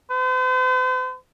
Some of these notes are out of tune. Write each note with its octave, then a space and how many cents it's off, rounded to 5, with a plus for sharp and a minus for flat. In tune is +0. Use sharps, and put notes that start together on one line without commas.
C5 -45